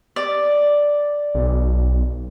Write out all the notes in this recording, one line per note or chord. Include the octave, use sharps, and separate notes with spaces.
D5
B1